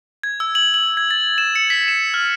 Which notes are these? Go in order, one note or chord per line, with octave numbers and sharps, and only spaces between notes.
G#6
E6
F#7
F#7
G#6
A6
E7
C#7
B6
E7
F6